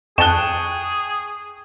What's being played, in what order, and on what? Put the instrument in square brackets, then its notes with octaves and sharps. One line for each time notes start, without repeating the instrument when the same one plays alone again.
[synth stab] F2 A5 F#6 [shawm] G#4 [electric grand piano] G5 C#6 [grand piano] E7 G7